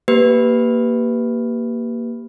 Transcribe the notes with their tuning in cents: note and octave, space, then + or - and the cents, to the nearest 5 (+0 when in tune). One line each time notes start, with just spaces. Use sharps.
A#3 +0 G4 -10 B4 +0